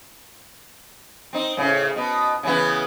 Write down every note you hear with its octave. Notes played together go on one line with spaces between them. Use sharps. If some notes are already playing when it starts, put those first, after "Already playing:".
C4 D#4
A2 C#3
B2
C#3 E3 B3